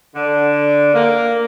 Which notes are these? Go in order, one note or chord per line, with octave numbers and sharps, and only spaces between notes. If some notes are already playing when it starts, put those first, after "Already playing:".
D3
A#3